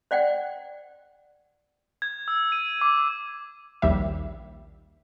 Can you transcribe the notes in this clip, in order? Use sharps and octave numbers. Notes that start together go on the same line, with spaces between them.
C5 D5 F#5 G5
G#6
E6
D#7
D6
A#1 D#2 G3 E5